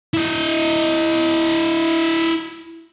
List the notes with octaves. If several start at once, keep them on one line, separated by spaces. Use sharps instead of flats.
E4 D#5